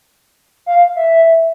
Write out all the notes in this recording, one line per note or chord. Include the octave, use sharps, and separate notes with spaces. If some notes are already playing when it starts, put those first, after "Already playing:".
F5
E5